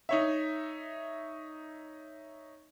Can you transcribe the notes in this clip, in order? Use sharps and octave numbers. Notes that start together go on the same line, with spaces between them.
D#4 C#5 E5